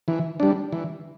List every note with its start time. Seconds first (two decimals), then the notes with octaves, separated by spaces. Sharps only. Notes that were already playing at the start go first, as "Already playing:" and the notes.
0.08 E3
0.40 G3 D4
0.72 E3